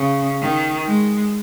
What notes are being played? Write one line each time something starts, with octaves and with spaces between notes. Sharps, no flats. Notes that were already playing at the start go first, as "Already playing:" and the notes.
Already playing: C#3
D#3
G#3